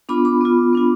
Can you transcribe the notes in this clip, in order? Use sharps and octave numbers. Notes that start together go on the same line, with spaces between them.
B3 D4 F4 B5 D6
B5 D6
B3 F4
B3 D4 F4